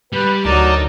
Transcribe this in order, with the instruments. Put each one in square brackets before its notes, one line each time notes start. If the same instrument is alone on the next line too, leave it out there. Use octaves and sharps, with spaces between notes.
[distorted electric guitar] G3 [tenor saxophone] B4
[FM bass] D2 [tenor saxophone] F#3 [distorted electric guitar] D#4 [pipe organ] A#4 D5 A5